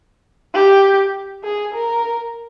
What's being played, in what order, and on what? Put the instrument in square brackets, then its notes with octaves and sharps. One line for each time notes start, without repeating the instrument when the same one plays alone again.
[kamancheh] G4
G#4
A#4